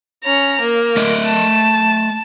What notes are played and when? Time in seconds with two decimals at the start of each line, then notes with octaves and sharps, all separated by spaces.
0.24 C#4 A#5
0.61 A#3
0.96 A3 D#5 E5
1.26 A5